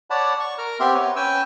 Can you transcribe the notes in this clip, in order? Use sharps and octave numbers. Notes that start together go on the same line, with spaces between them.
C#5 D5 F#5 A5 B5
C#6
A#4 A#5 F6
B3 C4 G4 E5 C6
B3 B4 C#5
C#4 B4 G5 G#5 E6